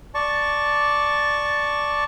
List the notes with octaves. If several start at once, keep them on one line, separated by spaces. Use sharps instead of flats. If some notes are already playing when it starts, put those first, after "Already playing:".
D5 A5 C#6